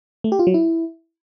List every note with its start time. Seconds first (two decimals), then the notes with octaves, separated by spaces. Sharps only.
0.24 A3
0.32 G4
0.39 F4
0.47 F#3
0.54 E4